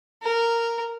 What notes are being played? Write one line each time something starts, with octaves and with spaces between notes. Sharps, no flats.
A#4